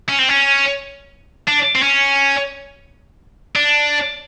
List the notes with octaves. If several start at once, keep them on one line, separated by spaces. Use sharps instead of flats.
C#4
C4
C#4
D4
C4
C#4
D4